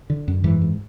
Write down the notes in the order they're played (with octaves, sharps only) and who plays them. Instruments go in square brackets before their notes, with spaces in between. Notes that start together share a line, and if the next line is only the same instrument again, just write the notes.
[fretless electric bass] D3
F#2
G#2 E3
G#2